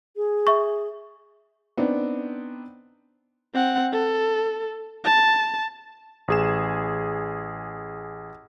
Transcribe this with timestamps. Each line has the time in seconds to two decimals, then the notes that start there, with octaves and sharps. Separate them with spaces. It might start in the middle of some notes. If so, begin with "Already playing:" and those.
0.16 G#4
0.47 E5 C#6
1.77 B3 C4 D4 D#4
3.54 C4 F#5
3.92 A4
5.05 A5
6.28 A1 G#4 E7